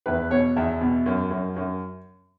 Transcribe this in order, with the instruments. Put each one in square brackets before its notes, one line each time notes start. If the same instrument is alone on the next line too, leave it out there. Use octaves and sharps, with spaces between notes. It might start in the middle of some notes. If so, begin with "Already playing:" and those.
[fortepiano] E2 B4
B2 C#5
E2 E5
B2
F#2
F#2
F#2